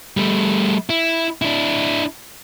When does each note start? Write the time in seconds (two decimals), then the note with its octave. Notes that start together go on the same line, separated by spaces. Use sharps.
0.17 G3 A3
0.90 E4
1.42 D4 E4